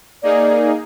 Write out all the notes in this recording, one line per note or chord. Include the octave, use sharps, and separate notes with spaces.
A#3 D#4 G#4 D5